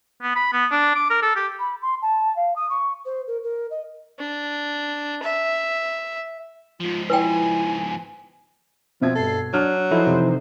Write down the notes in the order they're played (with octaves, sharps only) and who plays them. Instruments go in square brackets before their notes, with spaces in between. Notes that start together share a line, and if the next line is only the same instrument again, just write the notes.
[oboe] B3
B5
B3
D4
D6
A#4
A4
G4
[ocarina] B5
C6
A5
F5
D#6
C#6
C5
A#4
A#4
D#5
[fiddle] D4
E5
[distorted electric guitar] G#2 F3 [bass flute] F4
[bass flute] E4 [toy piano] B4 G5 [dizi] G#5
[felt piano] B2 E5 G#6 [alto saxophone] F3 [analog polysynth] C4
[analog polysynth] G2 C7 [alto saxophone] A4
[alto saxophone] F#3 [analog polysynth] D4 [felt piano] F6
[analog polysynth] E3 D#4 C5 [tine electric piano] F3 E4 A4
[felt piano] C3